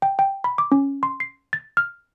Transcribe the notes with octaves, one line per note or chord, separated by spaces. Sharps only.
G5
G5
B5
D6
C#4
C6
C7
A6
F6